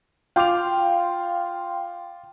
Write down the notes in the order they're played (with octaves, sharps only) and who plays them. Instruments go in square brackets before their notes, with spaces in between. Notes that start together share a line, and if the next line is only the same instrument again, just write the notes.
[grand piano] F4 D6 F7 [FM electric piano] F5 G5 C6